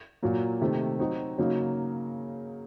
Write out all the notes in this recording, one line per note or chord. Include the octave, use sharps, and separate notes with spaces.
A#2 F#3 A#3
C3 D#3 A3
F#3 C4 D#4 F#4
C#3 F#3 A#3 D#4